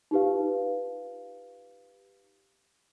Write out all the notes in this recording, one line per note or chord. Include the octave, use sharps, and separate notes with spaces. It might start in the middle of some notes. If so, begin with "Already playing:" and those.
D#4 F4 G4 B4 F5